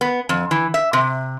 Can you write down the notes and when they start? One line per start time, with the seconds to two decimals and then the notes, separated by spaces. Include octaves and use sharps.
0.01 B3
0.29 F2
0.51 E3
0.74 E5
0.93 C3